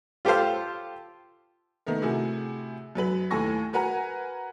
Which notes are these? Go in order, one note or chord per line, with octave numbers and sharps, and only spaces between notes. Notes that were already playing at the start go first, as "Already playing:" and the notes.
F4 G4 A4 C5 F5
D#3 A3 B3 A#4
A2 C3 F#4 G#4
F#2 F#3 B4 F#7
D#2 A2 A4 G#5 C#6 A#6
F#4 A#4 B4 F#5 G#5 A#5